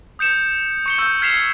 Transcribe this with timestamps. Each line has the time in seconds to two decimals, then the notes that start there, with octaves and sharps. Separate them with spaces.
0.19 D#6 G6 C#7 E7
0.86 C#6 C#7 G7
0.98 C#6 E6 G6
1.22 F6 G#6 B6 C7 E7 F7